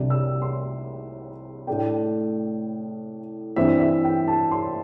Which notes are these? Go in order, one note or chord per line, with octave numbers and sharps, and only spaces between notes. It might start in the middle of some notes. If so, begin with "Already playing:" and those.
Already playing: C2 C3 G3 D4
E6
C6
A2 A3 D4 G5
G2 E3 C4 E5
E5
G5
A5
C6